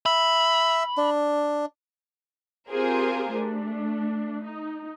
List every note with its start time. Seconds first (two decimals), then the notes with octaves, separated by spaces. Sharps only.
0.06 E5 B5
0.97 D4
2.70 C4 F4 G4 G#4 A#4 C5
3.35 A3 D4
4.44 D#4